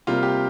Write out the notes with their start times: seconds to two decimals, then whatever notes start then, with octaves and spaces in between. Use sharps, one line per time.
0.07 C3 G3 A#3 F4
0.23 G4